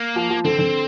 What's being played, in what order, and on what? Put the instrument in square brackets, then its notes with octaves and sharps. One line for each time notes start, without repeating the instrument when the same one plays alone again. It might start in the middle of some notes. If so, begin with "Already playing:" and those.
Already playing: [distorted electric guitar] A#3
[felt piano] F3
F3
[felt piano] D3 [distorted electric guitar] C4
[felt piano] D3